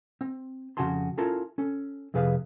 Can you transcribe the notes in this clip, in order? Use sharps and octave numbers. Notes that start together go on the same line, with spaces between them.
C4
F2 C#3 F#4 G#5 A5 C6
C#4 E4 F4 A4 A#4 A5
C#4 A4
F2 C3 G#4 B4 F5